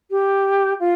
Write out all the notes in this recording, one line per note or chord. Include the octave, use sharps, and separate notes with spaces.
G4
F4